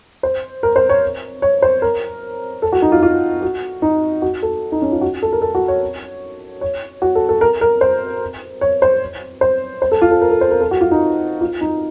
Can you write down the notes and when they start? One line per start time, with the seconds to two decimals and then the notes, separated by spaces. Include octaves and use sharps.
0.23 C5
0.63 A#4
0.76 C5
0.89 C#5
1.42 C#5
1.62 C5
1.82 A#4
2.62 A4
2.72 F#4
2.82 D#4
2.92 F4
3.02 F4
3.42 F#4
3.82 D#4
4.22 F#4
4.43 A4
4.72 D#4
4.82 C#4
4.92 F4
5.01 F#4
5.22 A4
5.33 A#4
5.42 A4
5.55 F#4
5.68 C#5
6.61 C#5
7.02 F#4
7.15 A4
7.29 A4
7.41 A#4
7.61 A#4
7.81 C5
8.61 C#5
8.82 C5
9.41 C5
9.82 C5
9.92 A4
10.02 F4
10.11 A4
10.22 A#4
10.31 A4
10.41 C5
10.51 A#4
10.61 A4
10.71 F#4
10.81 F4
10.91 D#4
11.41 F4
11.61 D#4